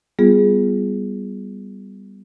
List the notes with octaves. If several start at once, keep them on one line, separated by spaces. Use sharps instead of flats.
G3 B3 F4 G#4